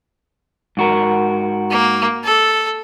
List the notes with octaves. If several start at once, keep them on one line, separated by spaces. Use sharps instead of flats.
G#2 F#4 A#4
A#3
A4